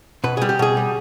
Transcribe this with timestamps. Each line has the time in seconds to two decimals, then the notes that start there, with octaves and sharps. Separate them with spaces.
0.24 B2 B4
0.37 G3 G#4
0.49 G4
0.59 B2 G#4
0.77 G3